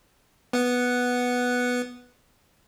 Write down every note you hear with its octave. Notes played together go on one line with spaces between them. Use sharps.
B3 F#5